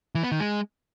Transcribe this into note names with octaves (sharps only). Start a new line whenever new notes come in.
E3
B3
D#3
G#3